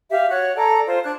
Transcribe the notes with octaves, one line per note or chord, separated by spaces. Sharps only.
G4 E5 F5
F#4 C#5 F#5
A4 D5 A#5
F4 C5
D4 F#6 G#6